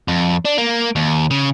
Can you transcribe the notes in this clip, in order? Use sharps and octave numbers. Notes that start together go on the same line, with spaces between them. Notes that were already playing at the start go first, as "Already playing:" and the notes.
F2
D4
A#3
D#2
C#3